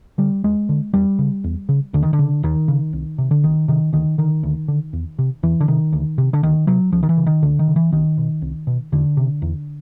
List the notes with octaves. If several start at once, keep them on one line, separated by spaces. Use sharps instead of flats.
D3 G3
D#2 G#3
D3
E2 G3
C#3
E2
C#3
D#2 D3
D#3
D3
C#3
D#2 D#3
C#3
C2
C3
D3
C2 D#3
C3 D#3
D2 D#3
D3 D#3
D2
D3
E2
C3
E2 E3
D3
C3 D#3
D2
C3
D3
D2 D#3
C3 F#3
C#2 F3
D#3
E3
C#3
D#3
C#2 D3
D#3
C#3
E3
C2 D#3
B2
C2
B2
E2 D3
C3
E2